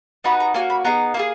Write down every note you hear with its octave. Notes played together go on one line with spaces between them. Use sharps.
B3 D#4 F#4 B5
A#5
A#3 C#4 F#4 G#5
B5
B3 D#4 G#4 A#5
A#3 E4 G#4